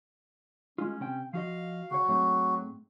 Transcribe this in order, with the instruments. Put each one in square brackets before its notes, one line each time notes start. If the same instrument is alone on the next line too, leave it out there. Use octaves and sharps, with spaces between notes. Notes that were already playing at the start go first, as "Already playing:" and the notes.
[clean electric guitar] G#3 F4 [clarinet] C#4
[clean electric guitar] C3 C4 G5
[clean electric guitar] F3 F#4 D#5 [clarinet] F5
[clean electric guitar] C#2 C#5 [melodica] F#4
[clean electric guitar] G#2 A3 C4 [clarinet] F#3